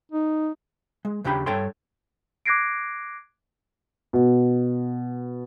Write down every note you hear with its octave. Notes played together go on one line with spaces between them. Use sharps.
D#4
G#3
D#2 C#3 D4 G4 G5 B5
G2 A4 C#5 G5 C6
D6 F#6 G#6 A#6 C7 D7
B2